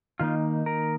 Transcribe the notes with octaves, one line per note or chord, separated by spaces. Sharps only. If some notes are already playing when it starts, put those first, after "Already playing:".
D#3 A#3 D#4 F4
A#4